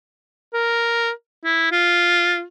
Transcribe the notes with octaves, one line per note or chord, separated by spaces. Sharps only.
A#4
E4
F4